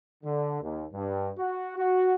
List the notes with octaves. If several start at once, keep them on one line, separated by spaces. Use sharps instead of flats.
D3
D#2
G2
F#4
F#4